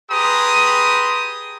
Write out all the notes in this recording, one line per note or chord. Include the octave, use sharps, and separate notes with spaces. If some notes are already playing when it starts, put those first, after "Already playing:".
G4 G#4 B4 A#5 C6 D#6